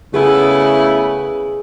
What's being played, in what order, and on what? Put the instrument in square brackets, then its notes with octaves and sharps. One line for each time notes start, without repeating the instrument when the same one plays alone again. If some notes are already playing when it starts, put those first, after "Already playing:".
[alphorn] C#3 [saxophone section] A3 B3 E4 [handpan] G#4